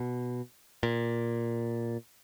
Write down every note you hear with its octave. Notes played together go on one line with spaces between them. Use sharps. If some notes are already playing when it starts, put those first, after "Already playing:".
Already playing: B2
A#2